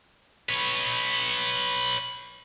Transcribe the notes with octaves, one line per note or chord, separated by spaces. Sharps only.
B4 C#5